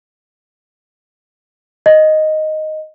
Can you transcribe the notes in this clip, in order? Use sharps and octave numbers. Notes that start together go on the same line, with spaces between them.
D#5